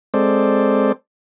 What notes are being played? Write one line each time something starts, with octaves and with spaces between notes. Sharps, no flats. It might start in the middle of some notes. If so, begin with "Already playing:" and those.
G#3 C4 A4 C5 D5